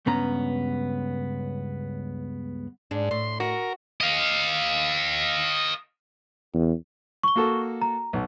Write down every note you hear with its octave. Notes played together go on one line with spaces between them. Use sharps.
C#2 G2 B3 C#4 A#5
G#2 D4
A2 C6
F#4 A#4
D#5 F5
E2
C#6 G7
A#3 F#4 A4
A#5
B1